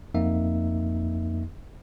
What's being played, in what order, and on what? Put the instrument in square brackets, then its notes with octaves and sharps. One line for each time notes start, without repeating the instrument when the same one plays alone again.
[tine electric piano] F2 A#3 D#4 E5